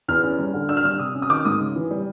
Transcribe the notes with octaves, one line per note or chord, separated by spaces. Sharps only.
E2 F6
C#4
G3
D3
D4 E6
F6
G3 E6
C3 D#6
C#4
D#6
D#3 D6
G#2 D#6
C#3
E3
G3